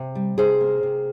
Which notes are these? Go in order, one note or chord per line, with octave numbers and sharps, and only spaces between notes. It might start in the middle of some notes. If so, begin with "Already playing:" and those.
Already playing: C3 E5
G3
C3 G#4 C5
A#3
C3